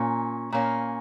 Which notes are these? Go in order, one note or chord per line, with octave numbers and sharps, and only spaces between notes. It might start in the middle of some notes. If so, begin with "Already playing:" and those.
Already playing: A#2 A#3 C#4
A#2 A#3 C#4